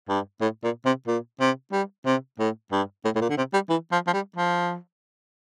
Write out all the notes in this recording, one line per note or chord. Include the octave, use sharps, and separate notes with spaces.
G2
A2
A#2
C3
A#2
C3
G3
C3
A2
G2
A2
A2
A#2
D3
C3
G3
E3
F3
F3
G3
F3